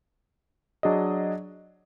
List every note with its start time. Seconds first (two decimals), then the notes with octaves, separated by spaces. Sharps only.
0.83 F#3 D4 G#4 D#5